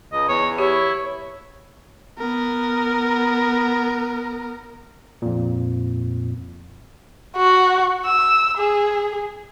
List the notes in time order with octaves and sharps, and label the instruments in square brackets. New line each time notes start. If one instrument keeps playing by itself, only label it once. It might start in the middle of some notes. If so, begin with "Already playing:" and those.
[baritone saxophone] C#2 [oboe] D#5
[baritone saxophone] E2 [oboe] C#5
[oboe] E4 [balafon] G4 [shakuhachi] C#5
[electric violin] B3 A#4
[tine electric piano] F2 A#2
[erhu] F#4
E6
G#4